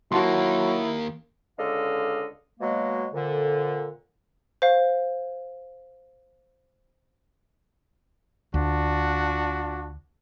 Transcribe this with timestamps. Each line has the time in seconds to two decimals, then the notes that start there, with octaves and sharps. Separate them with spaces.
0.12 D#2 F#3 A#3 E4 F#4 A5 C6
1.58 C#2 D3 A4 D#5 F5
2.60 B2 F#3 G#3 A#3
3.13 F2 A#2 D3
4.62 C5 F5
8.54 D2 D4 F4 F#4